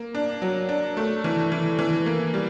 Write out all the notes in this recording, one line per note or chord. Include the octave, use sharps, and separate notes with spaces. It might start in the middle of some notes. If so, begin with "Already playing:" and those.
Already playing: A#3
D4
F#3
D4
A3
E3
E3
E3
A#3
G3